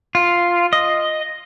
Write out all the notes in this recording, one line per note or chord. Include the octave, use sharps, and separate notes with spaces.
F4
D#5